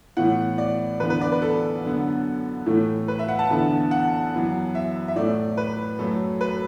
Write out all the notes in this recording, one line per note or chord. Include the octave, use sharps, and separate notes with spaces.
A2 E3 B3 F#5
D5
E2 D3 B3 B4
B4
D5
B4
A4
F#2 D3 B3
A2 E3 A3
B4
E5
F#5
A5
E2 D3 B3
F#5
F#2 E3 B3
E5
E5
A2 A3 D5
B4
F#2 F#3 A3 A4
B4